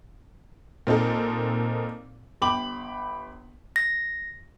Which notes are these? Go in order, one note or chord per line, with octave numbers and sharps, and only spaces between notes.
A#2 C4 D#4 A4
G1 G5 B5 D6 F#7
A#6